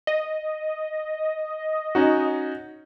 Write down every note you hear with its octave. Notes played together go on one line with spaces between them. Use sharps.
D#5
C#4 D#4 F#4